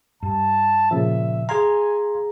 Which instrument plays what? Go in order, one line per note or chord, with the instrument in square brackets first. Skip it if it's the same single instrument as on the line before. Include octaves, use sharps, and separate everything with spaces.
[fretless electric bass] G2 [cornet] A5
[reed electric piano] A#2 C#3 F3 [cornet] E5
[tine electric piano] G#4 A#5 [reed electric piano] F5 C6 G#6 [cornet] G#5